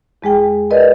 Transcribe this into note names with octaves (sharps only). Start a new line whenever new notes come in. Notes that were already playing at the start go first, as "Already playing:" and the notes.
E2 G#3 G#4 G5
A#4 B4 D5 D#5